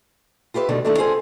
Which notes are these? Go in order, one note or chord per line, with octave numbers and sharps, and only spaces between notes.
F4 G4 B4 D5 E5
B2 D3 D#3 A3
D3 D#3 A3 D#4 E4 A4
C4 F4 G#4 A4 C5 G#5